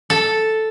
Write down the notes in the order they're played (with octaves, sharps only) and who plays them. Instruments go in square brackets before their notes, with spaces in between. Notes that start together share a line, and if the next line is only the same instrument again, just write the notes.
[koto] A4